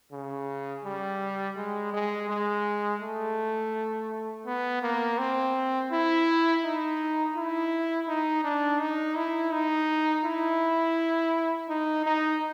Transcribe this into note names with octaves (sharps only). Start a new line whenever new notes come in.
C#3
G3
G#3
G#3
G#3
A3
B3
A#3
C4
E4
D#4
E4
D#4
D4
D#4
E4
D#4
E4
D#4
D#4